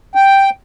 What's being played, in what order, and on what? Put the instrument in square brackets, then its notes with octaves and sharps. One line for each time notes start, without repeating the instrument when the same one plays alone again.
[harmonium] G5